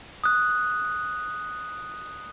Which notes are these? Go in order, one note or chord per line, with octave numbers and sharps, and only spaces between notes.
D#6 F#6